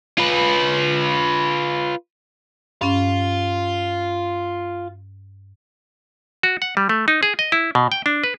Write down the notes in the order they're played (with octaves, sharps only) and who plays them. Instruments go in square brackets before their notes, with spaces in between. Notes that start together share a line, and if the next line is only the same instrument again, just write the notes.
[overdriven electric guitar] F4 B4
[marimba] G2 C#4 [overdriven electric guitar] F4
[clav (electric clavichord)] F#4
F#5
G3
A3
D#4
G#4
D#5
E4
B2
G5
D4
B4